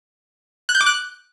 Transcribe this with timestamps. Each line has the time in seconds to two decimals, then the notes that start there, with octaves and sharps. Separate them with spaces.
0.69 F#6
0.75 G6
0.81 D6
0.86 F#6